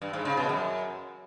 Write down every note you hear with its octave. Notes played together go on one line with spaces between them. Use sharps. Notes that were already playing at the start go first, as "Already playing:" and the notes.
G2
G#2
C#3
B2
F#2